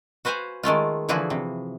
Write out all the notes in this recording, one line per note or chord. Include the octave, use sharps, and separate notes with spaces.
F#4 B4 C5 F5 G#5
D#3 G#3 A3 F4
D3 E3 F3 E4 F#4 G#4
C3